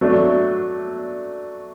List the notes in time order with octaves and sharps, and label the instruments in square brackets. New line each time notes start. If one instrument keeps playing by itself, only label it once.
[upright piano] F#3 A3 D4